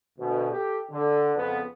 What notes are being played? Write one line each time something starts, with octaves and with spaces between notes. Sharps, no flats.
D2 B2
G4 A4
D3
F2 C#3 B3